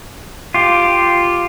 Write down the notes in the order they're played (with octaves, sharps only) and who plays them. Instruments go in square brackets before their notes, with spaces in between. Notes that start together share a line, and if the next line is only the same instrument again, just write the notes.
[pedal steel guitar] F4 G4